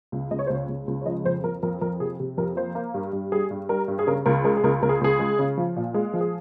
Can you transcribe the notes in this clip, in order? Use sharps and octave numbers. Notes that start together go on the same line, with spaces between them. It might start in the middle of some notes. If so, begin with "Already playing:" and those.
C#2
C#2 D#5
C#5
C5
C#2 C#5
C#2
C#2
C#5
F3 D#5
F2 C5
F2 A#4
F2 A#4
F2 A#4
C3 G#4
C3
F2 A#4
A#3 C5
A#3
G2
G2
G3 G#4
G2
G3 A#4
G2
G#4
C#3 A#4
C#2 A#4
G#3 A#4
G#4
C#2 A#4
C#2 A#4
G#4
C#2 G#4
G#3
C#3
F3
A#2
G#3
F3
G#4